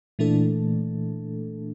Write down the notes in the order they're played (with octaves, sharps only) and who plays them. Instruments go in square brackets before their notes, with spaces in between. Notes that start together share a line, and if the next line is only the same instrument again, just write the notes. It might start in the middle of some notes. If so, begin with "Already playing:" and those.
[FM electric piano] A#2 E3 A3 D4 A4